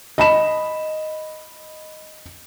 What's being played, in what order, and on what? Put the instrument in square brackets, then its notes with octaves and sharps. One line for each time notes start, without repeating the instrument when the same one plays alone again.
[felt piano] D#5 B5 E7